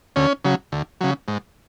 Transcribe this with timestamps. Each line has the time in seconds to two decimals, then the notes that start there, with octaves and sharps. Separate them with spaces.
0.16 D2 C#4
0.44 C#3 F#3
0.72 D2
1.01 C#3 F#3
1.28 G#2